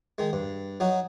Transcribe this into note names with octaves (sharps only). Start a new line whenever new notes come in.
D#3 G#3
G2
F#3 D#4 F#4